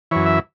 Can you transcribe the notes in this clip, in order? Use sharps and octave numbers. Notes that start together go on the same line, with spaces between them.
F#2 E3 C#5
E5